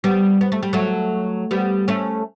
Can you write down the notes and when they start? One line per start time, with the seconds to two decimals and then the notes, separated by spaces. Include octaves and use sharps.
0.04 G3 B3
0.41 B3
0.52 A3
0.63 G3
0.73 F#3 A3
1.51 G3 B3
1.88 A3 C#4